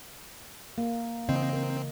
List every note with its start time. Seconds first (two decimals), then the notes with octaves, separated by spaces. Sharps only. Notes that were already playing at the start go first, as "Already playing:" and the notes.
0.78 A#3
1.29 C#3 E3 C4 D#5
1.53 A#4